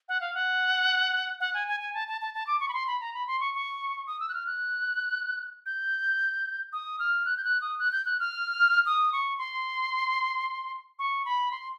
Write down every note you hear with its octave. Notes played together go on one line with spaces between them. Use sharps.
F#5
F5
F#5
F#5
G#5
G#5
G#5
A5
A5
A5
A5
D6
C#6
B5
C6
B5
A#5
B5
C6
C#6
C#6
D#6
E6
F#6
F6
F#6
G6
D#6
F6
F#6
G6
F#6
D#6
F#6
G6
F#6
F6
D#6
C#6
C6
C#6
B5
C6